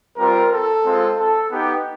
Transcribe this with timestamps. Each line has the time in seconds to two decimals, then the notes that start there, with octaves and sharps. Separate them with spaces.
0.17 G3 C4 F4 A#4
0.51 A4
0.84 G#3 C4 F4
1.18 A4
1.51 B3 D#4 G4